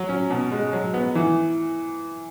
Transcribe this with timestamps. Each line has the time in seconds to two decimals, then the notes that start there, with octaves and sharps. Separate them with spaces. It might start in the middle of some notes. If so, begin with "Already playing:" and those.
Already playing: F#3
0.09 C#4
0.30 B2
0.52 G#3
0.73 F#3
0.94 B3
1.15 E3